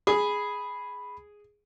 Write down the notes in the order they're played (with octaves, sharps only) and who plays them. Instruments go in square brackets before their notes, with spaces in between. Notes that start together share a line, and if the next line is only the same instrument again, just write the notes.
[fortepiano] G#4 [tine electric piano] B5